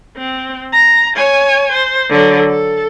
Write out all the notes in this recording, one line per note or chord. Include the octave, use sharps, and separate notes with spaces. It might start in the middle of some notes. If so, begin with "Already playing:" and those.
C4
A#5
C#5 G#5
C5
D3 F#3
A4